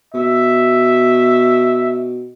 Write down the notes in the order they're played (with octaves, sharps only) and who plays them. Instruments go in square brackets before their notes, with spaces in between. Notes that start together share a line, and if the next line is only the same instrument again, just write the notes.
[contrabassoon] B2 [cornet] E5